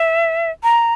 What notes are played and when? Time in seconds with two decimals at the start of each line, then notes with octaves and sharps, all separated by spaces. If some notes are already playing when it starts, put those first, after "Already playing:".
Already playing: E5
0.63 A#5